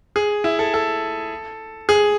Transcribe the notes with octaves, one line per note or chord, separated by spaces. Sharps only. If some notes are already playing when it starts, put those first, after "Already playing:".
G#4
E4
A4
A4
G#4